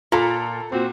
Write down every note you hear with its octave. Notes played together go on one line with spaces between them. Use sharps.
A#2 F4 A4 A#5
A#2 C4 F#4